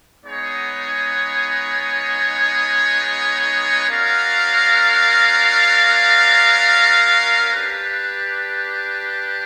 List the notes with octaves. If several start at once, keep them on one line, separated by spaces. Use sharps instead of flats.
G#3 B3 D#4 G#4 C#5
C#4 F#4 A#4 D5 F5
D4 G4 B4